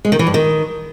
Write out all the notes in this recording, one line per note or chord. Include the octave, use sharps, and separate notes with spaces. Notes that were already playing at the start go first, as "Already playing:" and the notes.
G#3
D#3
E3
G2
D#3